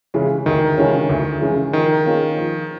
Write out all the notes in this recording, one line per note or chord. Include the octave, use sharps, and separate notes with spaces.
C#3 E3 G#3 C#4
D2 D#3
C#3 E3 G#3 C#4
D2
C#3 E3 G#3 C#4
D#3 F3
A#3 C#4 F4 G#4
F3